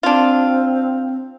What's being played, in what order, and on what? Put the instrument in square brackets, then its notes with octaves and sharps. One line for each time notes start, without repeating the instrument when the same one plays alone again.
[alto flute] C4 [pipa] D4 F4